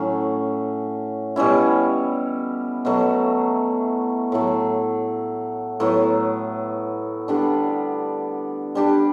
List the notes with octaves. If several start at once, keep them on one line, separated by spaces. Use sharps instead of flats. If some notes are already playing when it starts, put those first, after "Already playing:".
Already playing: A2 F#3 A3 C#4
B2 G3 C#4 E4
B2 F#3 A3
A2 F#3 A3
A2 F#3 B3
D3 G3 B3 D4
G3 D4 G4